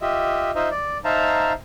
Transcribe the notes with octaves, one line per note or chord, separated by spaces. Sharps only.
F4 G4 D#5 E5
D#4 F4 C5 D#5 E5
D5
D#4 C5 E5 F5 A5 A#5